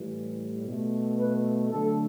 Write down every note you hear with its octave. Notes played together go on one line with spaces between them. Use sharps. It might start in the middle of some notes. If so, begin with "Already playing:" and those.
Already playing: A2 E3 G3
B2 A3
B4
D3 F#3 A3 A4